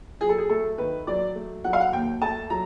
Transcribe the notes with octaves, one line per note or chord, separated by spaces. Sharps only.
F#3 G#4
A4
G#4
A3 A4
D#3 B4
F#3 D5
A3
F#3 F#5
F5
F#5
D#2 G5
A3 A5
F#3 A#5